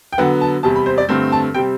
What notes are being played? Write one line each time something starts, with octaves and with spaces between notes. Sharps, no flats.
G5
D3 F#3 B3 F#5
A5
E2 C3 G3 A5
B5
C5
D5
G2 D3 A3 C4
A5
C3 G3 C4 G5